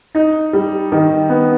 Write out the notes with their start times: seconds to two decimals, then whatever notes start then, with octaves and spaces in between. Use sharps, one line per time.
0.15 D#4
0.53 G3
0.92 D#3
1.29 B3